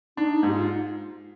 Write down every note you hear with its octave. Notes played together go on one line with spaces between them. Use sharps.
D4 D#4
D#4
G#2 G4
F4